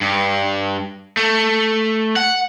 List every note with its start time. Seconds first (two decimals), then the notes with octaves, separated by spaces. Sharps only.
0.01 G2
1.17 A3
2.16 F#5